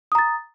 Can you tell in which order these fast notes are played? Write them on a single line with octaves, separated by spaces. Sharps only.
D#6 A#5 A6